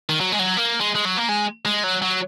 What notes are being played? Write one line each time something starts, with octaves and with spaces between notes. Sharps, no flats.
D#3
F#3
G#3
F#3
A#3
G#3
G#3
F#3
A#3
G#3
G#3
F#3
F#3